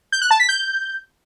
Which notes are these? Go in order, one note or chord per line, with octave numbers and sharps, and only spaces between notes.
G6
F#6
A5
B6
G6